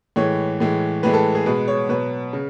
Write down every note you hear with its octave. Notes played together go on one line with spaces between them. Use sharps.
A2 E3 G#3 C#5
A2 E3 G#3
A2 E3 G#3 B4
A4
G#4
B2 G#3 B4
C#5
B2 F#3 B4
C#3